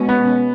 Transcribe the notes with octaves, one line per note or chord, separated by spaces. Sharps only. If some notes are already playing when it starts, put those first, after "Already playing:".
Already playing: B2 G#3 C#4
B3